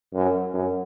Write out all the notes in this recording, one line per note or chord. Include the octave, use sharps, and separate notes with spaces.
F#2
F#2